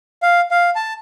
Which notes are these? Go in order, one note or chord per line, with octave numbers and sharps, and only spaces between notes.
F5
F5
A5